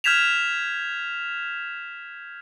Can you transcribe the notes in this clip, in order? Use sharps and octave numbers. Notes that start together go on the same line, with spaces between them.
F6 G6 G#6 B6 E7 F7